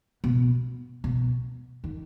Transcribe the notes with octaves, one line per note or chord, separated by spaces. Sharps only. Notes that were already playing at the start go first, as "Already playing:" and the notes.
B2
B2
D#3